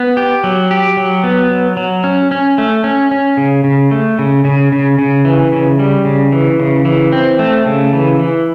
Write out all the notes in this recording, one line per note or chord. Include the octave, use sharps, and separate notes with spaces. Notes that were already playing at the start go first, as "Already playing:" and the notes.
Already playing: B3
G4
F#3
G4
F#3
B3
F#3
F#3
C#4
C#4
A3
C#4
C#4
C#3
C#3
A3
C#3
C#3
C#3
C#3
E3
C#3
G3
C#3
E3
C#3
E3
C4
A3
C#3
E3
E3